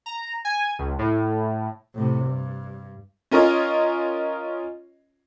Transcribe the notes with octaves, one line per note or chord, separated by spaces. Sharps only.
A#5
G#5
C#2
A2
A2 C3
G2
C#4 F4 A#4 C#5 D#5